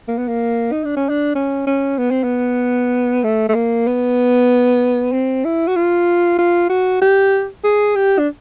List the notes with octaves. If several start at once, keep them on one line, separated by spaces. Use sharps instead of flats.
A#3
B3
A#3
D#4
D4
C#4
D4
C#4
C#4
B3
C4
B3
A3
A3
A#3
B3
C4
E4
F#4
F4
F4
F#4
G4
G#4
G4
D4